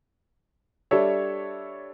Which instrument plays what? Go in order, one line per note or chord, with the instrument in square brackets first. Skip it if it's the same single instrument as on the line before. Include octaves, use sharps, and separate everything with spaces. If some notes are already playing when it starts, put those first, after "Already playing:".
[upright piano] G3 D4 A4 C#5 E5